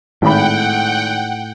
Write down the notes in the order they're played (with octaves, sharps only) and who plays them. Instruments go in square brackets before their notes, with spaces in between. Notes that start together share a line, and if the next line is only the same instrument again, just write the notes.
[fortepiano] G#1 B5 [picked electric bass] A2 [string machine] F#5 G5